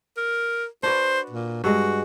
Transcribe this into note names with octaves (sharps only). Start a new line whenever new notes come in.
A#4
D4 F#4 B4 C5
A#2
G2 G#3 F#4